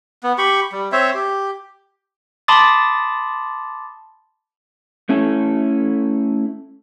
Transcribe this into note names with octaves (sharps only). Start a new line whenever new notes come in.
B3
G4 B5 C#6
G3
C4 C5 C#5 E5
G4
A5 B5 C6 D6 D#6 A6
A3 C#4 E4 A4